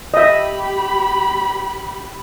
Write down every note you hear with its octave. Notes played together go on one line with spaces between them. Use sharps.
G4 D#5 E5 B5